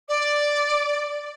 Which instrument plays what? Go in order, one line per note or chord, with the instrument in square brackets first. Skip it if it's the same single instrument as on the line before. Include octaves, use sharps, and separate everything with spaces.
[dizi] D5